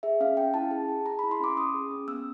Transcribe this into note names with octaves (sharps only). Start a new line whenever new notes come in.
G#4 E5
C#4 F5
C#4 G5
E4 A5
G#4
G#4
G#4 A#5
E4 B5
C6
C#4 D6
C#4 D#6
G#4
C#4
B3 E6